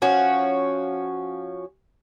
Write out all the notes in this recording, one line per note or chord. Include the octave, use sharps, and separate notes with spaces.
F3 C#4 F#4